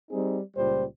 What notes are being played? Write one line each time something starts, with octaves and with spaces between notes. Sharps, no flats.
G3 C4 D#4 G#4
C#2 A#2 G3 C5